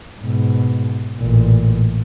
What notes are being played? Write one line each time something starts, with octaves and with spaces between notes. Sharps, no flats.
G#2 B2
A1 A#2